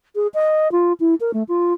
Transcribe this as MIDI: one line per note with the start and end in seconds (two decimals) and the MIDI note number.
0.15 0.27 68
0.34 0.71 75
0.72 0.93 65
1.00 1.15 64
1.20 1.31 70
1.34 1.43 57
1.48 1.73 65